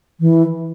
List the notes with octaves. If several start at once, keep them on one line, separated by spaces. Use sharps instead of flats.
E3